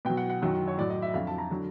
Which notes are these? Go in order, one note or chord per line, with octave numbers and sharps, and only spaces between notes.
B2 F#3 G5
F#5
F#5
F#2 D#3 F#3
C#5
A2 F#3 D5
D#5
E5
F2 D3 F#3 F5
A5
A#5
D3 F#3